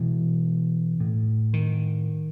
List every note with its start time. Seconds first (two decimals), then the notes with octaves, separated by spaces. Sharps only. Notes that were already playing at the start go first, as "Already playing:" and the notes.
Already playing: B2 E3
1.00 A2
1.53 D#3